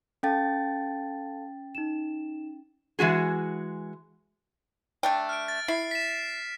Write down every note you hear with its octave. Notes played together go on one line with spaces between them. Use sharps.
C#4 A4 F5 G5 A5 A6
D#4 E7
E3 G#3 F#4 G#4
A3 D4 G5
F6 D7
A6
E4 C7
B6 E7